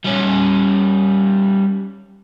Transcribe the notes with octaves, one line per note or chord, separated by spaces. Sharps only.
G3 C#4